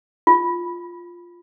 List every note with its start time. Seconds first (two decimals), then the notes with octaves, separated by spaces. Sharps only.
0.27 F4